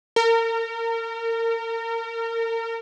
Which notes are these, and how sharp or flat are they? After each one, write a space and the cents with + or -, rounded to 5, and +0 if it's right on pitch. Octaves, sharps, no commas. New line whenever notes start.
A#4 -30